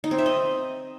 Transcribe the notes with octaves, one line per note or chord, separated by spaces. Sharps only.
D#4
C4
E5
D#5